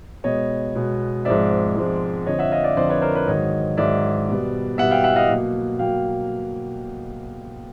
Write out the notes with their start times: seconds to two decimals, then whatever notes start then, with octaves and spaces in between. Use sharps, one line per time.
0.24 B2 G#3 B3 C#5 D#5
0.75 B2 G#3 B3
1.25 G#2 F3 G#3 C4 D5 E5
1.76 G#2 F3 G#3 C4
2.26 F2 D3 F3 C#5 D#5
2.39 E5 F#5
2.51 D#5 F5
2.64 D5 E5
2.77 F2 D3 F3 C5 D5
2.89 B4 C#5
3.02 A#4 C5
3.15 B4 C#5
3.27 G#2 D#3 F#3 C#5 D#5
3.77 G#2 D#3 F#3 D5 E5
4.29 B2 G3 B3
4.78 B2 G3 B3 E5 F#5
4.91 F5 G5
5.04 E5 F#5
5.16 D#5 F5
5.29 B2 F#3 A#3
5.79 B2 F#3 A#3 F5 G5